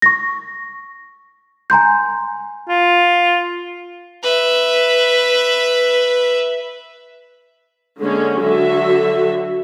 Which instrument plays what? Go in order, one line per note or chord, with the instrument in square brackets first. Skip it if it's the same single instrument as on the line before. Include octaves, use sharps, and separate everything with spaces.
[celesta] C#6 A#6
G#5 A#5 C6 G6
[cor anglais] F4
[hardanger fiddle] B4 E5
[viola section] D3 G#3 A#3 C#4
D3 F#3 F#4 A4 E5